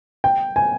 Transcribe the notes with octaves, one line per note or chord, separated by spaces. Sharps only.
G5
G#5